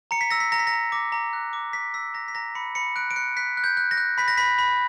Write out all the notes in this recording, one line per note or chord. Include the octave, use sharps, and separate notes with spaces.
A#5 C#7
B6
E6 A#6
B6
A#5 A#6
B6
A#5 A#6
D6 A#6
A#5
F#6
D6
A#5 B6
E6 B6
A#5 A#6
B6
A#5 A#6
B5 C#7
B5 C#7
F#6 D7
D7
F#6 C#7
F#6 B6
F#6
G6
F#6
A#6
F#6
B5 B6
A#6
B5 B6
B5